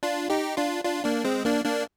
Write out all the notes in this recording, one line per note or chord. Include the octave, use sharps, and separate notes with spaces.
D4 F4
D#4 G4
D4 F4
D4 F4
A#3 D4
G#3 C4
A#3 D4
A#3 D4